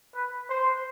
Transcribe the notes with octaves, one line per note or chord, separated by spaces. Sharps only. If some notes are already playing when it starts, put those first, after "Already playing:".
B4
C5